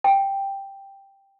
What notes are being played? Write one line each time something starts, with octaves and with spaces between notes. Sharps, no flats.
G5